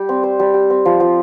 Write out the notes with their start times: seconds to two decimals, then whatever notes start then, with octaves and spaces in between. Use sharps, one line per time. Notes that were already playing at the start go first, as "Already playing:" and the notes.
Already playing: G3 G4
0.09 C4
0.23 C5
0.40 G3
0.54 G4
0.70 C4
0.85 F3
1.00 F3